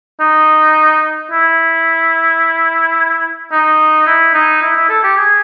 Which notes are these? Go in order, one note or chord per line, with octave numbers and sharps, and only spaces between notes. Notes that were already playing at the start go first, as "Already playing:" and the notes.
D#4
E4
D#4
E4
D#4
E4
E4
A4
G4
G#4